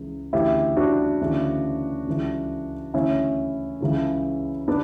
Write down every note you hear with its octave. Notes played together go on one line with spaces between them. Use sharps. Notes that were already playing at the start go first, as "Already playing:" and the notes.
Already playing: C#2 C#3 E3
D2 C#3 E3 E4 G4
D4 F#4
D2 C#3 E3
C#2 C#3 E3
D2 C#3 E3 C#4 E4
C#2 C#3 E3
B3 D4